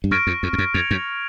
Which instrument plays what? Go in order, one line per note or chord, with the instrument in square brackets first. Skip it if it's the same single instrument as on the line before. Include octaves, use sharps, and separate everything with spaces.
[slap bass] G2
[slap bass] F#2 [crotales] C#6 F6 A#6 D7
[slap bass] F2
F2
F2
F#2
[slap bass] F2 [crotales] G#6 C#7 F7
[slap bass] F#2